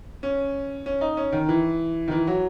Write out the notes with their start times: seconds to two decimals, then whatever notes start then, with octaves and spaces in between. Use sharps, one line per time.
0.23 C#4
0.86 C#4
1.01 D#4
1.17 C#4
1.32 D#3
1.49 E3
2.08 D#3
2.11 E3
2.27 F#3